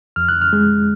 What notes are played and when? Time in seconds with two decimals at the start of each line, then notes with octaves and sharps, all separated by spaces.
0.16 F2 F6
0.29 F#6
0.42 F6
0.53 G#3